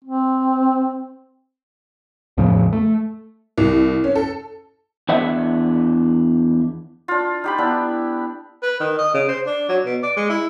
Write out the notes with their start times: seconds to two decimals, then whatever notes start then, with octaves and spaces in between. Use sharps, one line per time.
0.04 C4
2.38 E2 A2 C#3 F3
2.73 A3
3.58 C2
4.04 C#4
4.15 A4
5.09 E2 D4 E5 F#5
7.08 D4 F4
7.44 D#4 G4 B5
7.58 B3 D4 E4
8.62 B4
8.80 D#3
8.98 D#5
9.14 C#3
9.28 C5
9.46 D4
9.69 F#3
9.85 B2
10.03 D5
10.16 G#3
10.29 E4